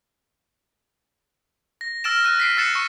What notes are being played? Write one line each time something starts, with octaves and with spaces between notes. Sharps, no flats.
A#6
E6 F6 A6 A#6 D7 E7
F#6 A#6 D#7
B6 C7 D7
E6 F#6 A6 C7 C#7 E7
C#6 C#7